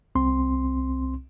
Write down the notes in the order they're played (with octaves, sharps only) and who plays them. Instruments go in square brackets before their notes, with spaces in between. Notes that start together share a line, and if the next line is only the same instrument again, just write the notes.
[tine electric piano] C2 C4 C6